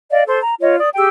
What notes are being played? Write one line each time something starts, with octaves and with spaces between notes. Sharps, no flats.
D5 D#5 F5
A4 C5 C6
A#5
F4 C#5 D#5
D5 D#6
G4 G#4 G5 E6